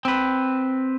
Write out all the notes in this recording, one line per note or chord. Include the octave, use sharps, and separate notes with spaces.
C4 B4